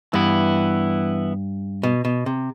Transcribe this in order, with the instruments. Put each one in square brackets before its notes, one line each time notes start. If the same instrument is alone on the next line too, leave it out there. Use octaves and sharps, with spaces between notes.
[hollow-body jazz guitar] G2 [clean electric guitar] E3 B3 E4
[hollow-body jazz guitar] B2
B2
C3